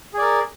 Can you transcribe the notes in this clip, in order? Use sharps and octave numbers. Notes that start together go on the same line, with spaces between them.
G#4 A#4 D5